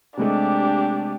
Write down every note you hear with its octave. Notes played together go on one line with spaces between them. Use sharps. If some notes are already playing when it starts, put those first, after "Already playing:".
C3 G#3 A3 D4 G4